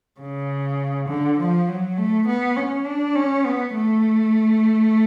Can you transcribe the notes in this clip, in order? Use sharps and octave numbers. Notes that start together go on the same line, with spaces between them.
C#3
D3
F3
F#3
A3
B3
C#4
D4
C#4
B3
A3